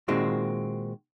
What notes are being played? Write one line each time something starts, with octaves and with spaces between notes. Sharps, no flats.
A#2 D#3 G#3 C4 F#4